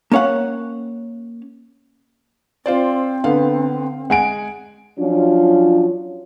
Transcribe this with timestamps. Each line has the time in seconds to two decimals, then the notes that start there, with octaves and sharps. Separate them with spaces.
0.12 A#3 C#4 C#5 F5 F#5
2.66 C4 F4 C5 D5
3.24 D3 B3 F5
4.10 G#3 F#5 G#5 D7
4.99 F3 F#3 C#4 D4 F4